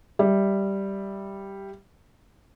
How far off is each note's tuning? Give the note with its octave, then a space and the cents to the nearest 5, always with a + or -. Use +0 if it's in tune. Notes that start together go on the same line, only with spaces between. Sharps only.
G3 +0 E5 +0